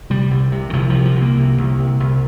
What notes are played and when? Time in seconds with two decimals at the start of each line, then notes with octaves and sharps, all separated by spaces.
0.10 C3 G3
0.31 C2
0.52 C3
0.70 D#3
0.73 C2 F3
0.90 C3 F3
1.05 F3
1.16 C2
1.21 A#3
1.37 C3
1.57 C2
1.79 C3
2.00 C2